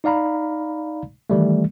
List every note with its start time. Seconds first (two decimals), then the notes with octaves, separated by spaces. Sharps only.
0.04 D#4 D5 F5 A#5 B5
1.30 D#3 E3 G3 A3